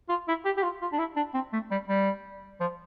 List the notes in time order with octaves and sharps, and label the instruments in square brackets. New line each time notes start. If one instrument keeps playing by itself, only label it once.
[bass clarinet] F4
E4
G4
G4
F4
F4
D4
E4
D4
C4
A3
G3
G3
F3